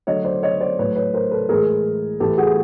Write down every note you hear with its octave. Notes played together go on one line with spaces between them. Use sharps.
D3 F#3 A3 C#5 D#5
C5 D5
C#5 D#5
C5 D5
A2 F#3 A3 B4 C#5
B4 C#5
A#4 C5
A4 B4
A2 E3 G#3 G#4 A#4
A2 E3 A3 G4 A4
F#4 G#4